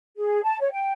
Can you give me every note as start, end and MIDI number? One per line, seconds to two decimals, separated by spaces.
0.17 0.41 68
0.43 0.58 81
0.61 0.68 73
0.72 0.92 79